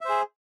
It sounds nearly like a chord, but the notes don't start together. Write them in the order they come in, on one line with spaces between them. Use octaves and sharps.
E5 C5 G#4